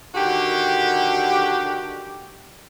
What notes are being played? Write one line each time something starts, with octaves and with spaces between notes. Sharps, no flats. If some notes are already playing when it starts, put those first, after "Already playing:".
D3 D#3 F#4 G4